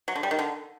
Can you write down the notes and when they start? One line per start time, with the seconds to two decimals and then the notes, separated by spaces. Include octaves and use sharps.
0.08 F#3
0.15 D3
0.23 G3
0.31 D#3
0.39 D3